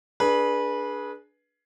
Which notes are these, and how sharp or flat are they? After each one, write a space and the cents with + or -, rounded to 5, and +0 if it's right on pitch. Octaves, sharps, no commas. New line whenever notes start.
D4 +0 G#4 +15 B4 -20